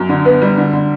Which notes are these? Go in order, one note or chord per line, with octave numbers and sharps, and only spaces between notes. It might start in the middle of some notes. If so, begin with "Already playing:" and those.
Already playing: F#2
D3
B3
G3
D3
D3